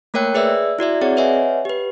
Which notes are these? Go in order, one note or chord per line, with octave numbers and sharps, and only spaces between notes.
A3 A#3 A#4 C#5 G5 F#6
G#4 B4 D5 E5 E6
E4 F#4 D5 E5
C4 G#4 C#5 D5 F#5
B4 C#5 D#5 E5 F#5 G#5
G4 B4